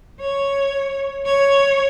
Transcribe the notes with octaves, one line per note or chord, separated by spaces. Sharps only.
C#5
C#5